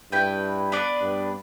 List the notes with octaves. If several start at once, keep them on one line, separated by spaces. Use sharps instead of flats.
G2 E4 B4 G5
B3 D4 B4 D5
G2